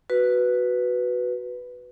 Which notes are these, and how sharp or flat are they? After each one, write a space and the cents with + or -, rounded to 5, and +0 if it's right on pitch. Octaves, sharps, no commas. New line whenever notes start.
F#4 +0 B4 +0